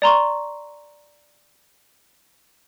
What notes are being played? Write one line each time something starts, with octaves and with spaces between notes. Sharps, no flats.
D5 A#5 C6 C#6